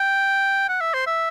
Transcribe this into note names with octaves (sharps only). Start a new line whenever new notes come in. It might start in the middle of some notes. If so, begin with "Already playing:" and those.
Already playing: G5
F#5
E5
C5
E5